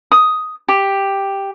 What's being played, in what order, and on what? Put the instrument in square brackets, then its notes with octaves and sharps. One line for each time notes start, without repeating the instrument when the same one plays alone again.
[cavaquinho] D#6
G4